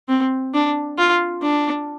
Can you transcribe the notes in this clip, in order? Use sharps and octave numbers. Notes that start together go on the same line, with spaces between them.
C4
D4
F4
D4